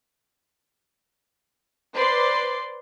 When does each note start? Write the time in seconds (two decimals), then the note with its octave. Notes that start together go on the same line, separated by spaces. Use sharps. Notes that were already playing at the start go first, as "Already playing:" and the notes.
1.94 B4 C5 D5 C6